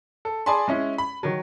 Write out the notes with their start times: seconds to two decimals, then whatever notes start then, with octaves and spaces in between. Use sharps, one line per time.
0.25 A4
0.46 G#4 D5 G#5 A5 B5 C6
0.68 G#3 C#4 E4
0.98 B5
1.23 D#3 F#3